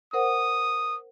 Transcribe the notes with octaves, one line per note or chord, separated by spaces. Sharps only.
A#4 C5 F#5 D#6